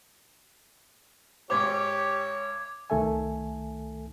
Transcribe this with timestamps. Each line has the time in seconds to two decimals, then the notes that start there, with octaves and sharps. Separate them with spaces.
1.50 G#1 G#2 G4 C5 C#5 D6 G#6
2.90 C2 D#3 A3 A4 E5 G#5